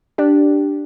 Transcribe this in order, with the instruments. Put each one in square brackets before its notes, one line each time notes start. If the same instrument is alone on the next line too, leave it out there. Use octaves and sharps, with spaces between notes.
[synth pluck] D4 G4